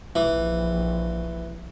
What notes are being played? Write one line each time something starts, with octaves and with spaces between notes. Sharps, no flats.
A#1 E3